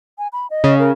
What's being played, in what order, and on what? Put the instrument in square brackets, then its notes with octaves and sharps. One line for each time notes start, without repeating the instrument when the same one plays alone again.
[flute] G#5
B5
D#5
[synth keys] C#3
[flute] A#4